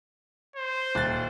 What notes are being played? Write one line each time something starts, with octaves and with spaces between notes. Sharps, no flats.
C5
D#1 F#6 A6